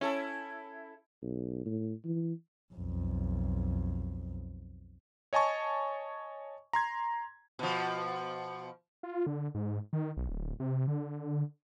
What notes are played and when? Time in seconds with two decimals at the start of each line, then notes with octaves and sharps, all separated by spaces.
0.01 C#4 E4 A4
1.23 B1
1.66 A2
2.05 E3
2.74 B1 F2
5.33 C#5 D#5 G#5 A5 C#6
6.73 A#5 C6 G#6
7.59 B2 F3
9.03 F4
9.27 D3
9.55 G#2
9.93 D#3
10.17 B1
10.29 D1
10.60 C3
10.87 D3